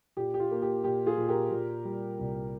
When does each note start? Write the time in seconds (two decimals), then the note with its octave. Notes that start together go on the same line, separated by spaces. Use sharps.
0.17 A#2 G4
0.34 G4
0.40 F4
0.51 A#3
0.62 G4
0.84 A#2 G4
1.06 F4 G#4
1.18 A#2
1.28 G4 A#4
1.51 A#2
1.85 G3
2.19 C2